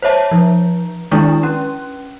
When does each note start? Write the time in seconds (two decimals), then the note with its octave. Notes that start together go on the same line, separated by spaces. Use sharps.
0.02 C5 C#5 E5 A5
0.31 F3
1.11 D#3 G#3 D4 E4
1.43 C#4